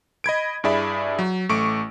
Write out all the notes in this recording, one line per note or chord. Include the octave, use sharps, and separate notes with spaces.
D#5 B5 G#6 D7
G2 E4 G#4 D5 E5 B5
F#3
A1 A3 C#6 D6 D7